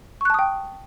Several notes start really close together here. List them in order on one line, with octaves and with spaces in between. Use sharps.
C#6 F#6 A5 D#6 G5